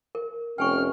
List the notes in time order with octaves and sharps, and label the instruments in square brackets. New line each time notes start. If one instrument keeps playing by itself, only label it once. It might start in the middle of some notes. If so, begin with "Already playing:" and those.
[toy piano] A#4
[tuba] F1 [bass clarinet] C#4 [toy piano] G5 G#5 C#6 [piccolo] F6